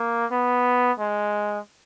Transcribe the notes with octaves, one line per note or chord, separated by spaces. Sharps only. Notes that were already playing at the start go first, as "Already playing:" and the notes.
Already playing: A#3
B3
G#3